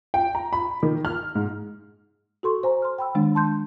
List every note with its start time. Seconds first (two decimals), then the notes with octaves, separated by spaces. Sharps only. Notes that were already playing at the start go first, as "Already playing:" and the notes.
0.14 G5
0.35 A#5
0.53 B5
0.83 D#3
1.05 F6
1.35 G#2
2.43 F#4 A4 C6 C#6
2.63 C5 G#5 A#5
2.82 C6 F6
2.98 G5 B5 E6
3.15 D#3 G#3 D4
3.35 A5 C6 G6